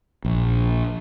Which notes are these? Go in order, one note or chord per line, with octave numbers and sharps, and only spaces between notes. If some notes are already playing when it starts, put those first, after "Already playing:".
A#1